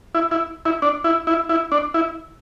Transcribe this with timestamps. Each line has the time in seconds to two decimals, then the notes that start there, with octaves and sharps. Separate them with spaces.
0.15 E4
0.31 E4
0.65 E4
0.82 D4
1.04 E4
1.27 E4
1.49 E4
1.72 D4
1.94 E4